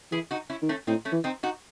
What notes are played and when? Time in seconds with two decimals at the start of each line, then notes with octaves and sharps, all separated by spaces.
0.12 E3 E4 G#4
0.31 D#4 F#4
0.50 C#4 E4
0.62 D#3
0.69 A3 C#4
0.87 A2 C4 D#4
1.05 A3 C#4
1.12 E3
1.24 C4 D#4
1.43 D#4 F#4